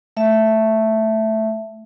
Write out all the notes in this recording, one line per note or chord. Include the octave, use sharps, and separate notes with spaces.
A3 E5